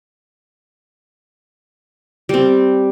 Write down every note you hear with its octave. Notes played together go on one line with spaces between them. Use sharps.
G3 C4